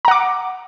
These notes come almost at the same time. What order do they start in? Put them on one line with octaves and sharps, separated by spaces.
A#5 F#5 D6